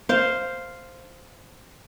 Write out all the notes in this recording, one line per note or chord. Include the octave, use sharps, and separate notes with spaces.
C5 F5